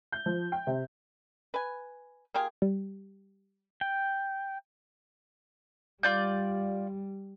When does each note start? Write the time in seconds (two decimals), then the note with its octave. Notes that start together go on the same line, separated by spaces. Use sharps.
0.12 G6
0.26 F3
0.52 G5
0.67 C3
1.54 B4 G#5
2.34 A#3 F4 G4 G#4
2.62 G3
3.81 G5
6.03 G3 F4 D5 G6